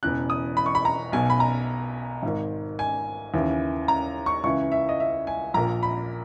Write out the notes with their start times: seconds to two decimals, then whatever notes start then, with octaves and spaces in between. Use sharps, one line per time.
0.03 E1 E2 C#3 F#6
0.30 D#6
0.57 B5
0.66 C#6
0.75 B5
0.85 A#5
1.12 B1 B2 G#5
1.30 B5
1.40 A#5
2.23 G#1 G#2 D#3
2.79 G#5
3.34 D#2 C#3 E3
3.88 A#5
4.26 C#6
4.44 C#2 C#3 E3 C#6
4.72 E5
4.89 D#5
5.00 E5
5.27 G#5
5.54 A#1 A#2 A#5
5.83 B5